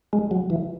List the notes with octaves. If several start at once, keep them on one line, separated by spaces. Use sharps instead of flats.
G#3
F#3
E3